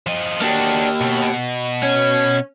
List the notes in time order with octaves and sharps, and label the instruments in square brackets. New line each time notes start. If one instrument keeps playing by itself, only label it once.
[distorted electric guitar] F3 D#5
[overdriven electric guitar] A#3 G4 [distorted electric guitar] D4 F#4
[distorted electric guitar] B2
[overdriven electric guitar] C#4